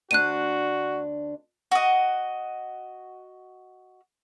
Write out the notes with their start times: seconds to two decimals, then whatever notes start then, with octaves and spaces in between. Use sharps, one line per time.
0.11 D2 D4 F#4 F#6 D#7
1.71 F#4 D#5